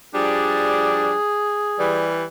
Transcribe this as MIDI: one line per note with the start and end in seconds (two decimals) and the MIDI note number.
0.15 1.15 53
0.15 1.15 55
0.15 1.15 62
0.15 2.14 68
1.79 2.24 52
1.79 2.24 55